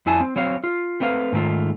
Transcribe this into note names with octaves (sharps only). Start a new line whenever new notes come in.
F2 E4 G#5 A5
C4
F#3 C4 C#5 F5
F4
A3 C4 B4 E5 F5
G#2 D#3 A3 F4